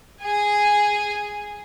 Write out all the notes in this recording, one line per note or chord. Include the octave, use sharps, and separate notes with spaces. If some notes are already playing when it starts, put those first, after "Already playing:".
G#4 G#5